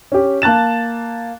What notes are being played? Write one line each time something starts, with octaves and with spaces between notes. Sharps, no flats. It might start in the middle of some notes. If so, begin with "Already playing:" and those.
C#4 G4
A#3 A5 F#6 A6 E7